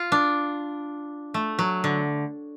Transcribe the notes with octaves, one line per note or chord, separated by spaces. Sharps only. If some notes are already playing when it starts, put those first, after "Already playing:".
Already playing: F4
D4
A3
F#3
D3